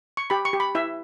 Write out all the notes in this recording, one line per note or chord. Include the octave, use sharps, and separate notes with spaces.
C#6
G4 B5
C#6
G4
B5
E4 E5